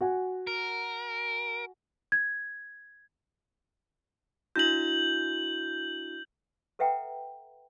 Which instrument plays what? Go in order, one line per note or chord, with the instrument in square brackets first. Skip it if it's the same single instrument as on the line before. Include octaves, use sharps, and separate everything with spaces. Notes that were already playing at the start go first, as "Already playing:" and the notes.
[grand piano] F#4 F#5 G#5
[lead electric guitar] A#4
[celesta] G#6
[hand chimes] D4 E4 F#4 [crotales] G6 F#7
[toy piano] A4 B4 E5 F#5 G5 A#5